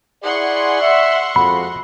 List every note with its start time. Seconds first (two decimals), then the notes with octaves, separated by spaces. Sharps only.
0.24 E4 G#4 D5 F#5 C6 C#6
0.80 E5
1.36 F2 G#3 F#4 B5